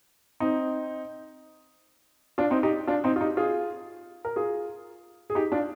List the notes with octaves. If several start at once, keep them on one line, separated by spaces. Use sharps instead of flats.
C4 D#4
D4 F4
C4 D#4
D#4 G4
D4 F4
C4 D#4
F4
D#4 G4
F4 G#4
A#4
F4 G#4
G#4
D#4 G4
D4 F4